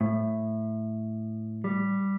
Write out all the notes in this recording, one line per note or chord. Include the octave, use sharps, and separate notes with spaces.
A2
G3